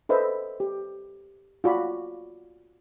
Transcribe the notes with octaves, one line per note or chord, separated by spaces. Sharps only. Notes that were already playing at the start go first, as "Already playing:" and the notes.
A4 B4 C5 D#5 E5
G4
F4 F#4 D5 B5